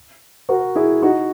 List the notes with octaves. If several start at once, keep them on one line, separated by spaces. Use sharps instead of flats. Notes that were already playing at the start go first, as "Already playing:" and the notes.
F#4 A#4
E4 G#4
D#4 F#4